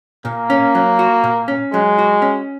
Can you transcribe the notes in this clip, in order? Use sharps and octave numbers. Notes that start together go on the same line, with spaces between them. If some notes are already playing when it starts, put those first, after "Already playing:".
A#2 A#3
C#4
F#3
F#4
A#2
C#4
F#3 G#3
F#4
C#4